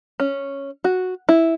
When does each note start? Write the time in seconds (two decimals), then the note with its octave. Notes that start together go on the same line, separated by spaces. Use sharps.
0.20 C#4
0.84 F#4
1.29 E4